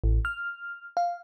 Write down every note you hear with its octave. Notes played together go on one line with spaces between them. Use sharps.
A1
F6
F5